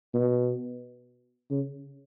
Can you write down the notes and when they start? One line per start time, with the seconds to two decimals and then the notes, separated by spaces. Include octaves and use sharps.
0.14 B2
1.50 C#3